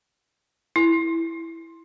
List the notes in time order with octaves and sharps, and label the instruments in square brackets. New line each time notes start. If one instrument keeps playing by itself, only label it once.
[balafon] E4